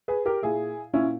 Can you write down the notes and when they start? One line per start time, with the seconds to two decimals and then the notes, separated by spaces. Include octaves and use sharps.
0.08 G#4 B4
0.26 G4 A#4
0.43 A#2 E4 G#4
0.93 A#2 C#4 E4